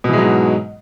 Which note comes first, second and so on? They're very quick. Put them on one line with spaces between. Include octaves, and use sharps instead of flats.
B2 E3 G#3 F#3 G#2